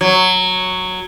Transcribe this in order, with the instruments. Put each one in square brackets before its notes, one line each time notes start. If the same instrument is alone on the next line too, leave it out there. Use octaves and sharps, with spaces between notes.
[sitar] F#3